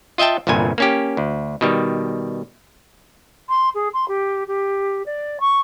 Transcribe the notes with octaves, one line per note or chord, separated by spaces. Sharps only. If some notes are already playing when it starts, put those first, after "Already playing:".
F4 D#5 E5 G5 A5
G1 C2 G2 A#2 G#5
A#3 C#4 G4
D2
B2 D#3 G3
C6
G#4
C6
G4
G4
D5
C#6